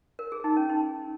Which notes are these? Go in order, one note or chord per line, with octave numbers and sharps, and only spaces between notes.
A#4
G#4
D#4
C#4
D#4